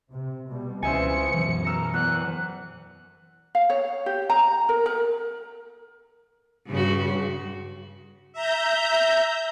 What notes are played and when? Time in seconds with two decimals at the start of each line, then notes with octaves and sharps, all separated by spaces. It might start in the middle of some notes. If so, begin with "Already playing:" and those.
0.11 C3
0.49 B2 G3
0.83 C#2 E3 C4 C5 E5 G#5 C#7
1.34 F#2 B2 E3 F#3
1.64 A#5 E6 F6
1.94 E2 F#6
3.55 F5
3.70 C#5
4.06 G4
4.30 A#5
4.69 A#4
4.86 A#4
6.70 G2 C#3 F#4
8.33 E5 A#5 G6